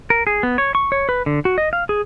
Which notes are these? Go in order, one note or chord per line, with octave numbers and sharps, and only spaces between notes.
A#4
G#4
B3
C#5
C#6
C#5
B4
D3
F#4
D#5
F5
G#4